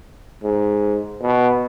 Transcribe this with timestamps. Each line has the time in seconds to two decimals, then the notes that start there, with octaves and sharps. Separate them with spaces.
0.43 G#2
1.22 B2